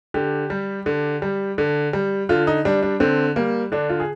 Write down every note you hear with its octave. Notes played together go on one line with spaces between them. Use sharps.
D3 G4
G3
D3
G3
D3
G3
D3 F4
D#4
G3 D4
D4
D3 C4
G3 A#3
D3 D4
F4
G#4